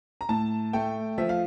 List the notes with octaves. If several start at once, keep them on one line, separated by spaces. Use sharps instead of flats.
A#5
A2 A5
A3 G5
F3 E5
F5